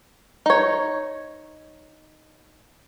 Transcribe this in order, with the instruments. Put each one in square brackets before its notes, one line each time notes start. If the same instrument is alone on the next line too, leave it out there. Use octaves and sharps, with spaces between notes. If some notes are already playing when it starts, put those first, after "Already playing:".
[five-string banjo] D#4 C#5